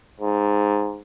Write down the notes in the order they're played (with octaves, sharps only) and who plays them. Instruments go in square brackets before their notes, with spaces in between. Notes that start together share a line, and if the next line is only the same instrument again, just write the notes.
[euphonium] G#2